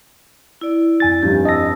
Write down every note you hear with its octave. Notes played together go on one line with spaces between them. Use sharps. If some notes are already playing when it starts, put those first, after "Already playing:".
E4 D5
F2 G#5 A6
F1 G2 G4
D#5 A5 D#6 E6 A#6